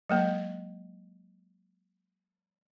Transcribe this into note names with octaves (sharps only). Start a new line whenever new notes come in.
F#3 G#3 A#3